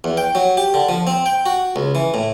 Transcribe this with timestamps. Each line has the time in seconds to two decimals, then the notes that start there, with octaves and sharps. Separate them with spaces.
0.04 E2
0.17 G5
0.35 F#3
0.57 G4
0.74 D3
0.89 F3
1.07 C4
1.26 G5
1.46 F#4
1.76 C#2
1.95 E3
2.14 A2